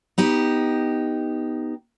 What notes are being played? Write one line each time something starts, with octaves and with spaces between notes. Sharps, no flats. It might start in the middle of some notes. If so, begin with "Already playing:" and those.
B3 D#4 G4